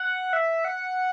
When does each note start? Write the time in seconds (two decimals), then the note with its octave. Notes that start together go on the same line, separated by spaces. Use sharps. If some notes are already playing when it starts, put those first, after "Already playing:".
Already playing: F#5
0.33 E5
0.65 F#5